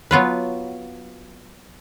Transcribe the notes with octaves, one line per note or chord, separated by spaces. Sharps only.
F#3 B3 F4 B4